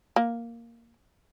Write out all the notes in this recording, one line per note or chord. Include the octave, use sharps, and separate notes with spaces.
A#3